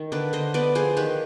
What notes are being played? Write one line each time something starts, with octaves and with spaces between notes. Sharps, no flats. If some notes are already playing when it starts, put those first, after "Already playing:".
Already playing: D#3
D3 B4 D5
D3 C5 D#5
B3 B4 D5
F3 G#4 C5
D#3 G4 B4